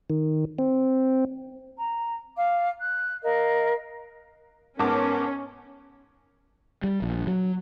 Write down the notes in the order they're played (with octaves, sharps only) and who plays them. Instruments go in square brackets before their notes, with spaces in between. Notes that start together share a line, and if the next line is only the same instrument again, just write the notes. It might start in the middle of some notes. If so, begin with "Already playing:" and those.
[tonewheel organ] D#3
C4
[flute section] A#5
F5 D6
F#6
A#4 D#5 F5
[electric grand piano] G#2 B3 [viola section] C#4 [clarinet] A#4 [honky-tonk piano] F#5 A5 D6
[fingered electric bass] G3
A#1
F#3